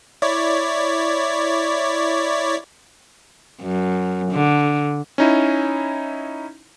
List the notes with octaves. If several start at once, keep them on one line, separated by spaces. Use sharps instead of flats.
E4 C#5 D5
F#2
D3
C#4 D#4 E4